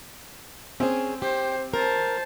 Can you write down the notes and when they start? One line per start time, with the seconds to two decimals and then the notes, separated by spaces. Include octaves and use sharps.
0.80 C4 C#4 G#4
1.22 G4 C5
1.74 A#4 C5 A5